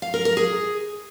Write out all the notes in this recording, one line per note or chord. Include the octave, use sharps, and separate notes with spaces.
F5
A#4
A#4
G#4